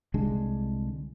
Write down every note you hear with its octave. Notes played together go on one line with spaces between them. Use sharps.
C2 D3 G#3 D4